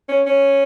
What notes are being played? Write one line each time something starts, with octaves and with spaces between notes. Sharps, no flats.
C#4
C#4